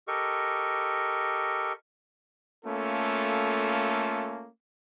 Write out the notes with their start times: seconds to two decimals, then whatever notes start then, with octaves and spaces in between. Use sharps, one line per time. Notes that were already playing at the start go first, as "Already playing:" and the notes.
0.08 G4 A4 A#4 D#5 C#6
2.65 A3 A#3 C#4 F4 A4